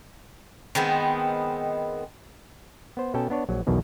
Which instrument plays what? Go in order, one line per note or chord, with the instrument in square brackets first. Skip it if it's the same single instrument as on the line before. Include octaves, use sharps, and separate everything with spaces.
[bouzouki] D#3 G#3 B3 C4
[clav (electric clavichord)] B3 C5
B2 C#4 A4 G5 A5
B3 D4 C#5
A#1 F#3
B1 E2 B2 D#3